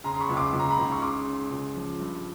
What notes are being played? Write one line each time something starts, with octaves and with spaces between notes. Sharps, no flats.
C#3 A#5 C6
C6
B5 C#6
C#2
C6 D6
C#2
A#5
B5
C#2 C6
C#6
C#3 C6 D6
C#3
C#2
F3
G2